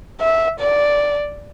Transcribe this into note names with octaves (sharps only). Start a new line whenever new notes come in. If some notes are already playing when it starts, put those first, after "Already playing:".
E5
D5